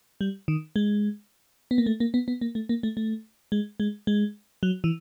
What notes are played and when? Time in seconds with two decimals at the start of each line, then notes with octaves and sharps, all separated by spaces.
0.21 G3
0.48 D#3
0.76 G#3
1.71 B3
1.78 A#3
1.86 A3
2.00 A#3
2.14 B3
2.28 B3
2.41 A#3
2.55 A3
2.69 A#3
2.83 A3
2.97 A3
3.52 G#3
3.80 G#3
4.07 G#3
4.63 F#3
4.84 E3